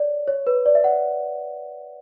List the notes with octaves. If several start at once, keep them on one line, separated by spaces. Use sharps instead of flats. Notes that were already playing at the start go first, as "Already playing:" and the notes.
Already playing: C#5 D5
C#5
B4
D5
E5
F#5